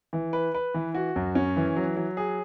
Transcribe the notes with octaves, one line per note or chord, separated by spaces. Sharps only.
E3
B4
B4
E3
F#4
F#2
C#4
E3
F#3
F#3
G#4